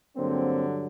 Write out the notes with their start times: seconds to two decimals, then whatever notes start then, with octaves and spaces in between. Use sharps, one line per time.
0.17 G2 D3 F#3 A#3 C4